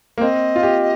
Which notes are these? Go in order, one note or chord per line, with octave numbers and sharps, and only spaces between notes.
A#3
C4 D#5
F4
G4